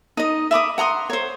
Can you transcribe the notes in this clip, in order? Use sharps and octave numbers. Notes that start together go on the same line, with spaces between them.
D#4 D#5
E5 B5 D6 D#6
F#5 A#5 C6 D#6
C5 C#5